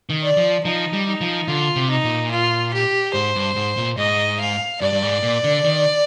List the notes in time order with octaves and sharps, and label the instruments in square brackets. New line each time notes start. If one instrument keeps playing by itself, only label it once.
[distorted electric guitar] D#3
[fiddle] D5
[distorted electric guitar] F3
[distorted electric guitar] F3 [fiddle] D#4
[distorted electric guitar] G3
[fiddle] D#4
[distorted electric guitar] F3
[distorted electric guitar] D3 [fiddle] F4
[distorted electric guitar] C3
[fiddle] D#4
[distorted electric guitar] A#2
[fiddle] F4
G4
[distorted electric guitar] G#2 [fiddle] C5
[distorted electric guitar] G2
G#2
A#2
[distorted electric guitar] G#2 [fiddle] D#5
[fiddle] F5
[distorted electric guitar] G2 [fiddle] D5
[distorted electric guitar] G2
G#2
A#2
D3
D#3